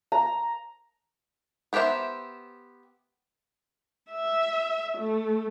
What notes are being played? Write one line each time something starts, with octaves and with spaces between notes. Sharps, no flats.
A#5
B3 G4 A#4 C5 E5
E5
A3